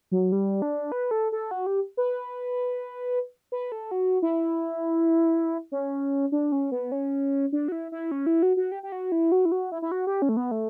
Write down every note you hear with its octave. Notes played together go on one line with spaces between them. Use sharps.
F#3
G3
D4
B4
A4
A4
F#4
G4
B4
B4
A4
F#4
E4
C#4
D4
C#4
B3
C#4
D4
F#4
E4
E4
C#4
E4
F#4
F#4
G4
G4
F#4
E4
F#4
E4
F#4
E4
E4
F#4
G4
C#4
A3
B3
A3